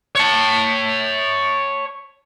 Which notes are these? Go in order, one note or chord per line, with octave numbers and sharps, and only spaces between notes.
C#5 A5